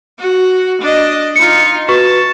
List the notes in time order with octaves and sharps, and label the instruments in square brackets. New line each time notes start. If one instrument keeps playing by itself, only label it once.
[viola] F#4
D4 D#5
[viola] D#4 F4 [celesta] C#7
[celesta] F#4 B4 C#6 [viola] A5